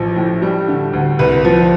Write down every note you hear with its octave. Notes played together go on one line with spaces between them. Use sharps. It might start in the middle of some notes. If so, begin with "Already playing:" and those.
Already playing: A1 F3
A2
G3
D3
D2
C2 B4
F3